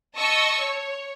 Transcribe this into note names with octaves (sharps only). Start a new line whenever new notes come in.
D#5 A5 C#6 E6
C#5